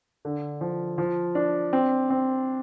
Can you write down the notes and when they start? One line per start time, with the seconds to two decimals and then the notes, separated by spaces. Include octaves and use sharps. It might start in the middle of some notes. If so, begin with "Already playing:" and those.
0.25 D3
0.61 F3
0.98 F3
1.35 D4
1.73 C4
2.10 C4